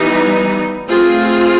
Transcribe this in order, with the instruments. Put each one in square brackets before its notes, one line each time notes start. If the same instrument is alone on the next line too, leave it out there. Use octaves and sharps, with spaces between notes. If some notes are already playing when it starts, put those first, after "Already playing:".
Already playing: [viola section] E3 G3 B3 D#4
A3 C4 F4 G#4